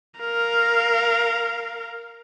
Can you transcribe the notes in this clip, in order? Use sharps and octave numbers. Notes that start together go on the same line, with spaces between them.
A#4 F5